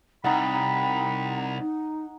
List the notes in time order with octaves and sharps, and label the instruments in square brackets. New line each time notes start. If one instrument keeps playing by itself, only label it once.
[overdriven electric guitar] C2 [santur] D#4 F#5 [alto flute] G5 [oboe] B5
[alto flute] D#4